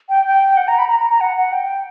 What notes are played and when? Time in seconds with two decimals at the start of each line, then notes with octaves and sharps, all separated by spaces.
0.09 G5
0.26 G5
0.57 F#5
0.68 A#5
0.78 B5
0.89 A#5
1.00 A#5
1.10 A#5
1.21 F#5
1.37 F#5
1.53 G5